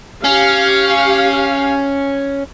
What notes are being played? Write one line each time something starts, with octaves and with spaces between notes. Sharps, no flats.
C#4 G4 F5